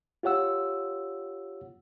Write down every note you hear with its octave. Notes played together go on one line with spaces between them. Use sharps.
F4 G4 C#5 F#5 E6